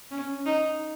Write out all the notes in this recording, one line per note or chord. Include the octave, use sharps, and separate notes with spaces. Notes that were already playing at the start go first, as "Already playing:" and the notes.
C#4
D#4